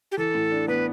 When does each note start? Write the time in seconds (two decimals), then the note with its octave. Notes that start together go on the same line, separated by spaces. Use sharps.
0.12 G4
0.17 E3 A4
0.35 A2
0.52 D4
0.68 B3 B4